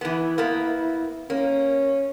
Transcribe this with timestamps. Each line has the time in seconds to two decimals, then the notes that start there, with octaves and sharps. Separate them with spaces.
0.01 E3 B3 E4
0.38 A#3 B3
1.30 A#3 C#4